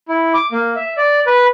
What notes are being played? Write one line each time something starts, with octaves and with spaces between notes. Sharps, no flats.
E4
D6
A#3
E5
D5
B4